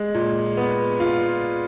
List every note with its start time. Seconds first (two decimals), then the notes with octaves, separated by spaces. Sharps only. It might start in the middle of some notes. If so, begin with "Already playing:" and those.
Already playing: G#3
0.14 A#2
0.57 B3
1.00 F4